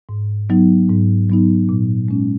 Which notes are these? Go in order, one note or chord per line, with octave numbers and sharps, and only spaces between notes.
G#2
F#3 B3 D#4
G#2
F#3 B3 D#4
A#2
G#3 C#4